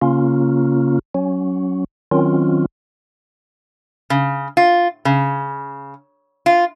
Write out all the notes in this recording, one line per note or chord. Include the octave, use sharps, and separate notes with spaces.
C#3 A#3 C#4 F4
F#3 C#4
D#3 F#3 C4 C#4 F4
C#3
F4
C#3
F4